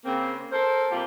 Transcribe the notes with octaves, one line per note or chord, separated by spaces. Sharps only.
C#3 A#3 C4
A4 A#4 C5
C3 G3 A#3 F4 G4